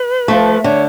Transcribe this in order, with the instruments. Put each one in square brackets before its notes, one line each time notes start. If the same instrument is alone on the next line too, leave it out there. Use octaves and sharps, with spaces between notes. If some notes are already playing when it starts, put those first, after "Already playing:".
Already playing: [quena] B4
[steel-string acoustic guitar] F3 A3
[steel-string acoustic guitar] D3 [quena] C#5